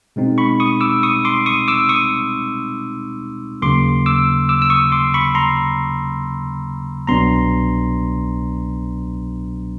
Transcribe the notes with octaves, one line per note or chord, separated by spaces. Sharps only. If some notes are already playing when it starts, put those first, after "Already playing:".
B2 G#3 C4 D#4
B5 C#6
C#6 D#6
D6 E6
C#6 D#6
C6 D6
C#6 D#6
D6 E6
C#6 D#6
D#2 C#3 F#3 A#3 C6 D6
D6 E6
D6 E6
E6
C#6 D#6
C6 D6
B5 C#6
A#5 C6
C2 B2 F#3 B3 D4 A#5 C6